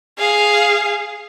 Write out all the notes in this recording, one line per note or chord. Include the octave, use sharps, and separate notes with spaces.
G#4 F5